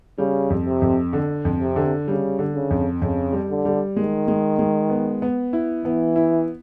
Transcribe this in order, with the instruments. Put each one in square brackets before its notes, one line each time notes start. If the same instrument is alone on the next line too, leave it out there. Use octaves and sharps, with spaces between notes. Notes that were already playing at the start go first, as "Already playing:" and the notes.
[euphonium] C#3 [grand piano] G3
[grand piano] F2
[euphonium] C3
[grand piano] F2
D3
F2
[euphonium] C3
[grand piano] D3
[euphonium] C#3 [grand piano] G3
[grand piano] D3
[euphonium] C#3
[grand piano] F2
[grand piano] F2 [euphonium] C#3
[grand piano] G3
[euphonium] D3
[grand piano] G3
[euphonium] D#3 [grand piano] G#3
[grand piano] G#3
G#3
B3
B3
E4
[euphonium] E3 [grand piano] B3
[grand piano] E4